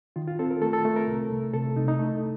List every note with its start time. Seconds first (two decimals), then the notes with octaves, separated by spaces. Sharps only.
0.16 D#3 F4
0.28 F4
0.39 C4 A4
0.51 A#4
0.62 A3 A4
0.73 A4
0.85 A3
0.96 A#4
1.07 C2
1.30 C2
1.53 C3 A4
1.76 C2 D#4
1.88 D#4
1.99 A3